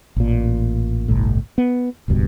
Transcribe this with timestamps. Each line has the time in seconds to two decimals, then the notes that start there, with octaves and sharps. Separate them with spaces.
0.16 A1 A#2
1.08 G1 C2 A2
1.58 B3
2.08 D#1 C#2 G2 B2